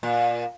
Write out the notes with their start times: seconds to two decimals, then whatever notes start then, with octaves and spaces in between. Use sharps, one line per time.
0.03 A#2